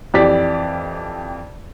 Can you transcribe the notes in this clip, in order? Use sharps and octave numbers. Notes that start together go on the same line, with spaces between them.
F2 E3 G4 D5 B6